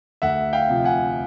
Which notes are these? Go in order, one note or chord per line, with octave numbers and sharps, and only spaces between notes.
D2 E5 F#5
F5 G5
C3 F3
F#5 G#5